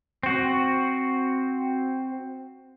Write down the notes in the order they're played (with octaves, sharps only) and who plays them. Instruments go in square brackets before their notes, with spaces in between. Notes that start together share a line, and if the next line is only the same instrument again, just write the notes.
[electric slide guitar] C4 F#4